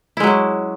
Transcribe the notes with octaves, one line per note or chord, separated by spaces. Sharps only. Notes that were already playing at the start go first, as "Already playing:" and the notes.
F#3 G#3 C#4 E4